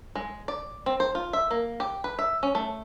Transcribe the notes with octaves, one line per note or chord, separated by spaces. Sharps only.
G#3
D5
C4
C5
F4
E5
A#3
G4
B4
E5
C#4
A3